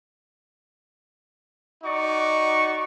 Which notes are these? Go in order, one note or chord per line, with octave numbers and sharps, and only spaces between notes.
D#4 F#4 D5 C#6